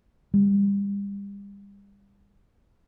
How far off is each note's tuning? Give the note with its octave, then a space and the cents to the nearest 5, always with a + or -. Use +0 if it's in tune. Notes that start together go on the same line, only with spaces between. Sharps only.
G3 +35